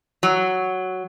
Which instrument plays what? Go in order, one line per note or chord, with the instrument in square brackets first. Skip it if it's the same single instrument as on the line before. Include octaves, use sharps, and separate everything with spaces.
[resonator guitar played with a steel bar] F#3